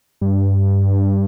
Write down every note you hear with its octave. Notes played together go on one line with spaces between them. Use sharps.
G2